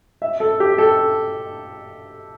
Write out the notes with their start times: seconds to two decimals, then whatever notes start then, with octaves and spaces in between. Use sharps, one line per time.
0.22 E5
0.40 A4
0.60 G4
0.78 A4